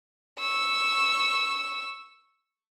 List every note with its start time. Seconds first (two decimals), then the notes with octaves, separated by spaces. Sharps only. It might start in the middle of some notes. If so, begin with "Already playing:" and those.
0.39 C#6 E6